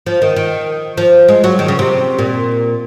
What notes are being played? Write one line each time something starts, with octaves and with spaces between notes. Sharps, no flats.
F3
D#3
D#3
F3
G#3
F#3
D#3
C#3
C3
A#2